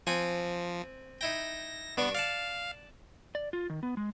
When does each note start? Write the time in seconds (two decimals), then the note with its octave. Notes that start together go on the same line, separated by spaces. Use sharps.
0.07 F3 C4 F#5 G#5
1.21 D#4 E4 G5 A#6
1.97 G2 B3 D4 C#6
2.15 D5 F5 F#5 A5
3.35 D5
3.53 F4
3.70 D#3
3.83 B3
3.97 G#3